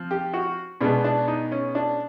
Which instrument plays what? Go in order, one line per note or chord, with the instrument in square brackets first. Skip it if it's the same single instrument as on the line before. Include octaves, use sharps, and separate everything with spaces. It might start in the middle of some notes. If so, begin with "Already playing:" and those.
Already playing: [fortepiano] F3 C4
G4
F#4
B2 G#3 B3 D4
D4
D#4
C#4
D4